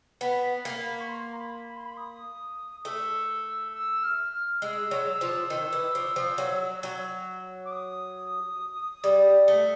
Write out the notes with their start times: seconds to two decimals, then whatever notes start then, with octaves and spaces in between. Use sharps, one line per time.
0.21 B3 B5
0.65 A#3
1.01 C#6
1.09 C6
1.33 A#5
1.39 B5
1.68 B5
1.77 C6
1.85 B5
1.97 D#6
2.85 A3 E6
3.74 E6
4.03 F6
4.33 F6
4.62 G#3 E6
4.91 F#3
5.21 F3
5.50 D#3
5.73 E3
5.95 F3
6.16 F3
6.38 F#3
6.83 F#3
7.65 D6
7.71 D#6
9.04 G3
9.48 A3